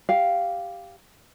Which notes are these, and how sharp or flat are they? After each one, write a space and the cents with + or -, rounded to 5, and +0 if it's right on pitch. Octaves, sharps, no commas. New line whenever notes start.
G4 +0 F5 +0